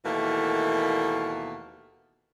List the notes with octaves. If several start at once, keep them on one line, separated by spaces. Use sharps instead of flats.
D#2 B2 E3 A3 A#3